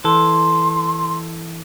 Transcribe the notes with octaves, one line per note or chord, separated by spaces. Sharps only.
E3 A4 C6